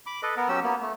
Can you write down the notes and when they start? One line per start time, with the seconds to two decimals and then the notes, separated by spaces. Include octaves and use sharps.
0.06 B5 D6
0.23 A4 B4 D#5
0.37 B3 A#4
0.49 F#3 C#4 G4 E6
0.64 A#3 B3
0.81 A3